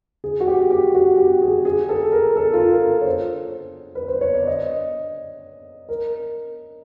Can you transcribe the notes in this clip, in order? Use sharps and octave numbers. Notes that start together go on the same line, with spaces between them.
G#4
F#4
G4
G4
F#4
G4
G#4
G#4
A4
A#4
A4
F4
A#4
C#5
C5
B4
C5
C#5
D5
D#5
A#4